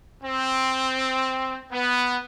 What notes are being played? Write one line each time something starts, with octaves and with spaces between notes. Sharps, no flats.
C4
B3